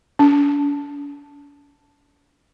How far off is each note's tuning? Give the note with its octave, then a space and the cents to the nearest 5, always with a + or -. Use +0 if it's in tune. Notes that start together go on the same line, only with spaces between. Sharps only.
D4 -45